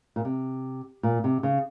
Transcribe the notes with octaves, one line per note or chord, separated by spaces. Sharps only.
A#2
C3
A#2
C3
C#3